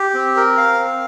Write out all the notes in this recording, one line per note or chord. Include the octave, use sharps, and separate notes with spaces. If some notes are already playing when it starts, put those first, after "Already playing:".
Already playing: G4
C4
A#4
F5
C4